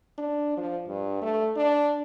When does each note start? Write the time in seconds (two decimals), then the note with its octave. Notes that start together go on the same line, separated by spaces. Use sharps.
0.18 D4
0.57 F3
0.88 G2
1.22 A3
1.56 D4